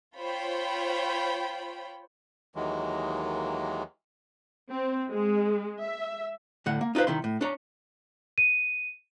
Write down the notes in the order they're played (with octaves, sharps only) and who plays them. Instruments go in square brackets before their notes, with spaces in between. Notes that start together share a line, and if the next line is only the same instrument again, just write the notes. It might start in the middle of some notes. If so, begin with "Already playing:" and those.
[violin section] F4 C5 C#5 G5 B5
[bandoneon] D#2 D#3 E3 F#3 G#3 A#3
[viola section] C4
G#3
E5
[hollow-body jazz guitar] A2 D3 F#5
A#3
D#4 F4 F#4 B4 C5
C2 D#3 E4 C6
A2
D4 C#5 A#5
[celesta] D#7